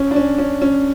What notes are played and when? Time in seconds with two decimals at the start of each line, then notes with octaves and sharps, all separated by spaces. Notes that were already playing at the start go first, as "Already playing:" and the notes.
Already playing: C#4
0.11 D4
0.16 C#4
0.38 C#4
0.62 C#4